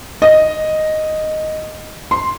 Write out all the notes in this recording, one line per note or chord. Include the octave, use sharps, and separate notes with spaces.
D#5
C6